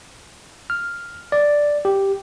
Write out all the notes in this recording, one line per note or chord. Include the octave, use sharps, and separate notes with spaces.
F6
D5
G4